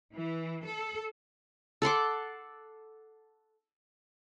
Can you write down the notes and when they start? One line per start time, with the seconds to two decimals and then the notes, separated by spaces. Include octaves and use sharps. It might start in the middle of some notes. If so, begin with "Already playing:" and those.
0.14 E3
0.65 A4
1.82 A4 F#5 C6 D6